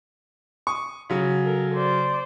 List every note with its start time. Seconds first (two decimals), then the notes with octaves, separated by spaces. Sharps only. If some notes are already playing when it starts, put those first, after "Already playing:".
0.67 C#6 D#6
1.10 C#3 F#3
1.44 A4 A#4
1.75 C5 D5